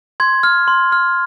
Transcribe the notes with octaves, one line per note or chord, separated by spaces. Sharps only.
C6 G#6
F6
C6
F6